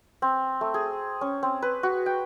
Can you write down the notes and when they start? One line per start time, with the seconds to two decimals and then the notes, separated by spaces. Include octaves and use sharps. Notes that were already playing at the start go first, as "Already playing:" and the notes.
0.22 C4
0.61 A3
0.74 G#4
1.21 C#4
1.43 C4
1.62 B4
1.83 F#4
2.06 G5